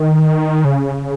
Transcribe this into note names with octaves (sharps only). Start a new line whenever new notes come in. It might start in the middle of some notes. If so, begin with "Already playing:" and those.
Already playing: D#3
C#3